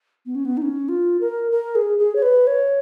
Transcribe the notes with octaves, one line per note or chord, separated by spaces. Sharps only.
B3
C#4
B3
D#4
C#4
F4
A#4
A#4
G#4
G#4
C#5
B4
C#5